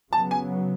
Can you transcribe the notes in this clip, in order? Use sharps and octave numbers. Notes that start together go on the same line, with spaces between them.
C#3 F#3 B3 A5
G#5